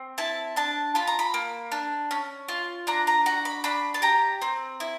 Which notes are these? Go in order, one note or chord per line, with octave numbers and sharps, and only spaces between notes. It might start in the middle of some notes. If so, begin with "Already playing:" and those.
Already playing: C4
E4 A5
D4 A5
F4 B5
A#5
B5
A#3
D4
C#4
F4
D4 A#5
A#5
F#4 A#5
B5
D4 B5
A5
G4 A#5
C4
E4